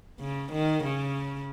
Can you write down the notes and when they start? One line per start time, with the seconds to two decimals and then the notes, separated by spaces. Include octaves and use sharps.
0.20 C#3
0.52 D#3
0.84 C#3